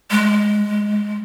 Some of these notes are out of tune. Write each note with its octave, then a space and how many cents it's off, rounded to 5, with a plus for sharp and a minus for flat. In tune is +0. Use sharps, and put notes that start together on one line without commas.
G#3 +5